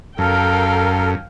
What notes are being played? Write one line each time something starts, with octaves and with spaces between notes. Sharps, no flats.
F#2 A4 A#4 F5 G5